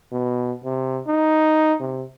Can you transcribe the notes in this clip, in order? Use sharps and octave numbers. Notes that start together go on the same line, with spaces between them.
B2
C3
D#4
C3